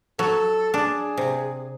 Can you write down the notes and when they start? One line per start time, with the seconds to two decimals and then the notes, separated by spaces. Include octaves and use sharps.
0.19 F#3 A4
0.74 D4 G#4
1.17 C3